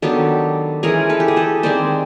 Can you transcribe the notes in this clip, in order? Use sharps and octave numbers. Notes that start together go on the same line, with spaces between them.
D#3 F#3 B3 D4 G4 A4
E3 G#3 C#4 G#4 A#4
A4 B4
G4
G#4
G4 A4
D#3 G#3 C4 C5 D5